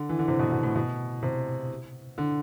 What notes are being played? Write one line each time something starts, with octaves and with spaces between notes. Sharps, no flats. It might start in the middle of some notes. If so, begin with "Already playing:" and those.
Already playing: D3
E3
D3
C3
B2
B2
A2
B2
C3
D3